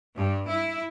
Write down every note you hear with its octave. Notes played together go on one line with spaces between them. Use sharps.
G2
E4